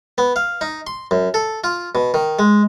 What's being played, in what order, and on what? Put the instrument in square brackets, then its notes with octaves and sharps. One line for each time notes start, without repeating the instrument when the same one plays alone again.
[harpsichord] B3
F5
D#4
C6
F#2
A4
F4
B2
D#3
G#3